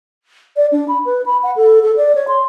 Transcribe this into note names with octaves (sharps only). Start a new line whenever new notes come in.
D5
D4
B5
B4
B5
F#5
A4
A4
D5
C#5
C6